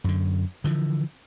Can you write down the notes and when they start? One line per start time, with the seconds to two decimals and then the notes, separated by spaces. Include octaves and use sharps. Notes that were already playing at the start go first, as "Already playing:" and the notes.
0.04 F#2 D3
0.64 D3 E3 F3